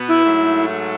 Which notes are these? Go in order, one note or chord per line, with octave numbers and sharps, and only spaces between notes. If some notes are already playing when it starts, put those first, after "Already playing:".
Already playing: B2 B3
E4
G#2 F#3 A3